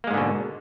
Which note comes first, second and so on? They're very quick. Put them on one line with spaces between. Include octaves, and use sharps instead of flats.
A#3 G#3 G#2 D3 B2